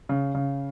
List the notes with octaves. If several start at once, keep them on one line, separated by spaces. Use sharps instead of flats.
C#3
C#3